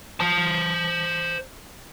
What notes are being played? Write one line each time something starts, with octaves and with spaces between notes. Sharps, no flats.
C5 A5